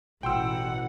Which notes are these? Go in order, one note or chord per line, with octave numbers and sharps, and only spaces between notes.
A1 B2 E3 F#5 G5 C6 E6